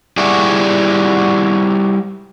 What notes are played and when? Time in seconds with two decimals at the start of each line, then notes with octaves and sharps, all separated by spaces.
0.17 G3 E4 F#4 G#4 D5